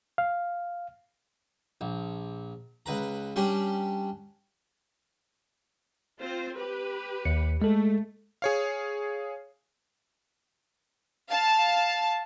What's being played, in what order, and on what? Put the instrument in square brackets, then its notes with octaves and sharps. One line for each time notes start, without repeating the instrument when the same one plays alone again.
[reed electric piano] F5
[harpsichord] A#1
C#2 B4 A#5
G3 C#4 D4 G4
[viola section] C4 F4 C5
G4 B4
[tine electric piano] D#2 C#7
[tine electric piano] G#3 A4 [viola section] A3
[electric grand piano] G#4 C#5 F5
[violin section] F5 A5